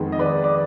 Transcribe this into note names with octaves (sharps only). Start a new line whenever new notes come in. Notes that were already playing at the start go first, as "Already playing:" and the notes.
Already playing: F2 D#3 G#3 B3
D#5
B4 D5
D5